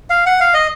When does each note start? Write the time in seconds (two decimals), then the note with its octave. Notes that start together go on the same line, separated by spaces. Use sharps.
0.10 F5
0.26 F#5
0.40 F5
0.54 D#5